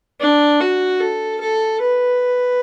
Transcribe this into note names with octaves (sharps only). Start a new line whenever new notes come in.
D4
F#4
A4
A4
B4